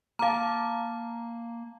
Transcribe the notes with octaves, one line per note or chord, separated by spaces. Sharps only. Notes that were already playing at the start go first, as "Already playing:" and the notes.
A#3 F5 A5 A#5 D6 F6